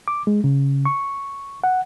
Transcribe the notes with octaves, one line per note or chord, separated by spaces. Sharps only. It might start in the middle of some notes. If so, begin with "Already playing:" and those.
D6
G#3
C#3
C#6
F#5